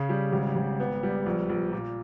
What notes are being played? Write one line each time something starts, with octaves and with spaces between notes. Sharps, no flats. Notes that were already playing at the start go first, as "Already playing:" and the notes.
Already playing: C#3 G#4
G3
G#1
G#1
B3
G3
A#1
A#1
A#2